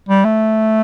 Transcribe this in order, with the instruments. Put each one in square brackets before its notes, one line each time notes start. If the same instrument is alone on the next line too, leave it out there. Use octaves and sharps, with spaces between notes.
[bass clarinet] G3
A3